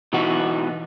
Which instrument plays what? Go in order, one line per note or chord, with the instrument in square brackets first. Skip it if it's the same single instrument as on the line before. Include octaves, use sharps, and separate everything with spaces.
[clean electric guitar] B2 E3 B3 D#4 F#4